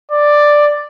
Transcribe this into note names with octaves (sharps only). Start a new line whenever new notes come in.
D5